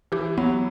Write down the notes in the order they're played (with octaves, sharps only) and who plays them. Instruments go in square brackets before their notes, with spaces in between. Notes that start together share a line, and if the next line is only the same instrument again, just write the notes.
[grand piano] E3 [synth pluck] G4
[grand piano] F#3 [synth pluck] B3